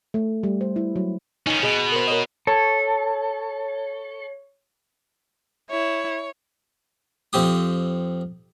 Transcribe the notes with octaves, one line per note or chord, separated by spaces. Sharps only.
A3
G3
C5
E4
F#3
D#3 C#4 D#4
B2 G#4 D#5
A#4 C5
A#4 C#5 D#5
A4 C#5
E4 C#5
F2 C4 G4 D#6